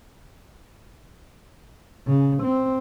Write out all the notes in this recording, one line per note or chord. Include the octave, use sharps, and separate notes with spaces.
C#3
C4